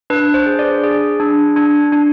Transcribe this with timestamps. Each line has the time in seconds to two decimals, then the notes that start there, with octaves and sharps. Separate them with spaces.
0.10 D4 B4
0.34 C5
0.46 G#4
0.59 D5
0.83 G#4
1.20 D4
1.56 D4
1.92 D4